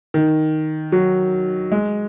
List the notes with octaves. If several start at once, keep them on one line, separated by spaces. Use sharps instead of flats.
D#3
F#3
G#3